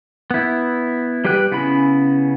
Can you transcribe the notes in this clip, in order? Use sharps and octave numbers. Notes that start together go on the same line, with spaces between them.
B3 E4
G3 G4 B4 G5 F#6
C#3 B3 C#4 E4 B5